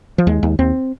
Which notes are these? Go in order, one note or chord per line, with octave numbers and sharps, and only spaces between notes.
F3
D#2 G#3
D#2
D#2 C4